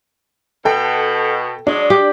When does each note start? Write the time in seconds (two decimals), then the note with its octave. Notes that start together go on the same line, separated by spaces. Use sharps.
0.65 B2 A4 G5
1.67 F#3 G#3 D4
1.90 G4